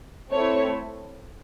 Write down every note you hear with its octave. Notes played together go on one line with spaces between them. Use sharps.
A3 C4 E4 C#5